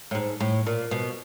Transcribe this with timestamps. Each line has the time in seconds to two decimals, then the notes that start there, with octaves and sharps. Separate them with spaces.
0.11 A2
0.15 G#2
0.40 A2
0.66 A#2
0.91 B2